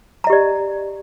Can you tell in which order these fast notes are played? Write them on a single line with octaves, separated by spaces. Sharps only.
A#5 D#5 G4 D5